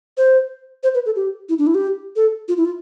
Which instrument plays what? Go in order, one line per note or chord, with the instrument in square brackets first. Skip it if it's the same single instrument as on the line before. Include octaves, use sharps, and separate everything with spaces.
[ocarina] C5
C5
B4
A4
G4
E4
D4
E4
G4
A4
F4
E4
F4